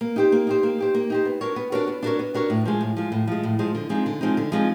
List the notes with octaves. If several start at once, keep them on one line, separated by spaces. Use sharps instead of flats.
A#3
D#4 G4 C5
A#3
D#4 G4 C5
A#3
D#4 G4 C5
A#3
D#4 G4 C5
B3
D4 F#4 A#4 C#5
B3
D4 F#4 A#4 C#5
B3
D4 F#4 A#4 C#5
B3
D4 F#4 A#4 C#5
A2
F3 G#3
A2
F3 G#3
A2
F3 G#3
A2
F3 G#3
D3
F3 G#3 C4 D#4
D3
F3 G#3 C4 D#4
D3
F3 G#3 C4 D#4